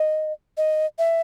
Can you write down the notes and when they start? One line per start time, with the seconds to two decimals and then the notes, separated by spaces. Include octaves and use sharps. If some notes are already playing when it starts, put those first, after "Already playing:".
Already playing: D#5
0.57 D#5
0.99 E5